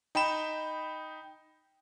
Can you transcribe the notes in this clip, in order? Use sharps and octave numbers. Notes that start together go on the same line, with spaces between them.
D#4 G5 B5 E7